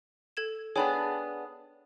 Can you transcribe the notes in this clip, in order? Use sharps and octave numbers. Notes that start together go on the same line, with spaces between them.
A4 G#6 E7
B3 D4 G#4 C#5 G5 B5